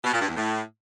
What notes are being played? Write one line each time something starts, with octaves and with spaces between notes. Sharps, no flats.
B2
A#2
G2
E2
A2